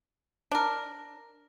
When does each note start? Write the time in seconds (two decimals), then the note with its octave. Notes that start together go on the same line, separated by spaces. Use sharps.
0.52 D4 A#4